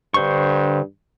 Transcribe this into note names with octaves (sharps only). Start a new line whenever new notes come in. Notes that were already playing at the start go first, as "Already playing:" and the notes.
G2 D3 C5 C#6